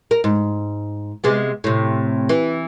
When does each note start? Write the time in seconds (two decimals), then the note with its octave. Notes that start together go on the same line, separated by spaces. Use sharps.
0.11 A#4
0.24 G#2
1.24 C3 G#3 B3
1.64 A2 C3
2.29 E3